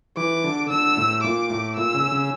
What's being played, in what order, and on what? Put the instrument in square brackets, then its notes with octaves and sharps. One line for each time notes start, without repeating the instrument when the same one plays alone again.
[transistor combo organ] E3 [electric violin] D6
[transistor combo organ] D3
[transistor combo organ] D3 [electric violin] E6
[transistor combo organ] A2
[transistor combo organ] A#2 [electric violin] D6
[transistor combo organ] A2
[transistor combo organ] A#2 [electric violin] E6
[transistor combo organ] C#3
C#3